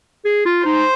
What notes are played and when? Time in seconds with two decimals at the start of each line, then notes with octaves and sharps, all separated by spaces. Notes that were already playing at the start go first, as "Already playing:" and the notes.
0.25 G#4
0.45 F4
0.65 D#4 C5